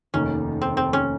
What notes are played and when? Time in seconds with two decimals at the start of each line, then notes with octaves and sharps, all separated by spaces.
0.14 F1 D#2 D#3 C#4
0.62 C4
0.77 C4
0.93 C#4